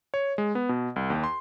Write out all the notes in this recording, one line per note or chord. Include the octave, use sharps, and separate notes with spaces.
C#5
G#3
B3
B2
C2
D#2
C6